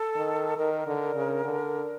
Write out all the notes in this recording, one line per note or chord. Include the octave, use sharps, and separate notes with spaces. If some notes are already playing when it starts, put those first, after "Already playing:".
Already playing: A4
D#3
D#3 A#4
D3
C#3
D3